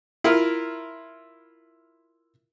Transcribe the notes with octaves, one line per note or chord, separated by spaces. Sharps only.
E4 F4 A#4